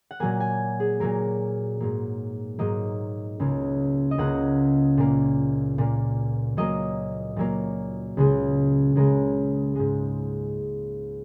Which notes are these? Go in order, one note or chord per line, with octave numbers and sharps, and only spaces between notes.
F#5
A#2 F#3 A#3 G#5
G#5
G#4
A#2 F#3 A#3 A#4
G#2 F#3 A#3
G#2 F#3 A#3 D#5
C#2 C#3 A#3
D#5
C#2 C#3 A#3 F#5
A#2 A#3
A#2 A#3
A#2 F#3 A#3 D#5
A#2 F#3 A#3
C#2 C#3 G#3
C#2 C#3 G#3 A#4
G#2 G#3